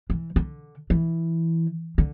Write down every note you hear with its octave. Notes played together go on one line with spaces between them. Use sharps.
E3
D3
E3
D3